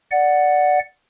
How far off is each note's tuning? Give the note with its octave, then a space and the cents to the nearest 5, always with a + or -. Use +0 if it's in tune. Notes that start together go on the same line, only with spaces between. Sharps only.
D5 +0 F#5 +0